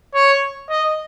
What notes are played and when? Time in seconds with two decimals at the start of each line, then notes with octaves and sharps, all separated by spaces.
0.15 C#5
0.70 D#5